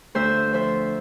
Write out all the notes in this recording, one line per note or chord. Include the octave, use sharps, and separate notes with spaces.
D2 C5 E5
F3 C5 E5